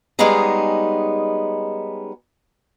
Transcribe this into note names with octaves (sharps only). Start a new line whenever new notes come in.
G3 G#3 B3 C#4 D#4 G#4